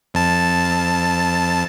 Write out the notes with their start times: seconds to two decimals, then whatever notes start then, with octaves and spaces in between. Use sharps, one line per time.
0.14 F2 A5